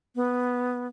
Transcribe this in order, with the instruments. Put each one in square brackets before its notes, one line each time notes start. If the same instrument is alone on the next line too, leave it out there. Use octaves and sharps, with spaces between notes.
[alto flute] B3